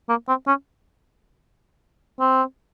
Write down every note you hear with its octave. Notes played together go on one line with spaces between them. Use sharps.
A#3
C4
C#4
C4